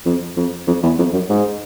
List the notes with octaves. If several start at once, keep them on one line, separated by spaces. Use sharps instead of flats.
F2
F2
F2
E2
F2
F#2
G#2